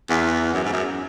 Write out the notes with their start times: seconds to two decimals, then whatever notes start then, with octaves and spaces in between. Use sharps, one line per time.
0.10 E2
0.54 F#2
0.64 G#2
0.73 F#2